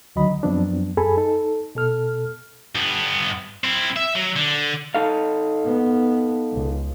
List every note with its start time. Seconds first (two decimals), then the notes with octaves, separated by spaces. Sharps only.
0.16 D2 D3 D#3 F#3 D#5 B5
0.43 F#2 F3 F#3 B3 C4 D4
0.97 F#2 G#4 A4 G#5 B5
1.17 D#4 A4
1.75 B2 A4 F6
2.75 G2 B3
3.64 C4 E4
3.96 E5
4.16 F#3
4.36 D3
4.94 D#4 A4 F5
5.65 B3
6.53 C#2